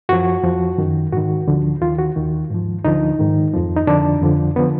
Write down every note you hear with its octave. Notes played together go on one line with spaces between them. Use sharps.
F#2 F3 F#4
F2 F3
F#2 D#3
G#2 D#3 F#4
D2 D3 F3
D#2 D#3 F4
F#4
D#2 D#3
G#2 F3
D2 D3 F3 D#4
G#2 D#3
F2 F3
D#4
F2 D3 F3 D4
F2 D3 F3
D3 F3 B3